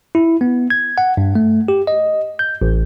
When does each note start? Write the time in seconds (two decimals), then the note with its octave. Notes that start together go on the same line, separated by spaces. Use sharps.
0.15 E4
0.41 B3
0.70 G#6
0.98 F#5
1.17 G2
1.35 A3
1.68 G4
1.87 D#5
2.39 G6
2.62 A1